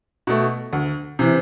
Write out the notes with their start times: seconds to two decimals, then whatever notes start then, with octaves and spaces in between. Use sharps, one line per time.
0.27 B2 A3
0.73 D2
1.19 C3 E3